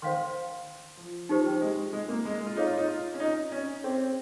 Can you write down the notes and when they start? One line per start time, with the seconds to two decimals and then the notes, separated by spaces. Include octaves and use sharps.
0.02 D#3 C5 F5 C6
0.97 F3
1.29 F3 D#4 G4 C5
1.45 G3
1.61 G#3
1.93 G#3
2.08 A#3
2.25 G#3
2.46 F4
2.57 D#4 G#4 C#5 F5
2.67 F4
2.78 D#4
2.88 F4
3.14 C#4
3.20 D#4
3.52 C#4
3.84 C4 G#4 C#5 G5